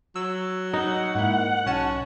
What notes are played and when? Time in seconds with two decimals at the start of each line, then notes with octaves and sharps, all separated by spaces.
0.16 F#3 E6
0.73 D#4 F#5
1.15 G#2 A#3 E4
1.66 B1 C#4 A5